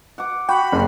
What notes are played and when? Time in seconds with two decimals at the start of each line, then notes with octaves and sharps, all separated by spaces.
0.18 F#5 D6
0.49 F#4 G5 B5
0.72 F#1 G4 C6